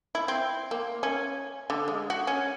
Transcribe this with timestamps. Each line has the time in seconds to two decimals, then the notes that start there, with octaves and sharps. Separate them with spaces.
0.15 E4
0.28 C4
0.71 A#3
1.03 C#4
1.70 D3
1.88 G#3
2.10 F#4
2.27 C#4